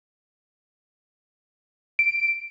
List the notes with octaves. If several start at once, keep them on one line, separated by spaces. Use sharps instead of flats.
D7